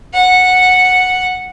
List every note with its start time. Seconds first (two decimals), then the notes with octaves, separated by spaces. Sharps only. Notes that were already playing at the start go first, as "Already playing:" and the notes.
0.14 F#5